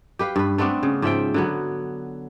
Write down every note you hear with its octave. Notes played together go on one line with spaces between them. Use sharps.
G4 B4 F5
G2 B4
A3 B3 C4 D4
C#3
G#2 F3 E5 G5
D3 F#3 B3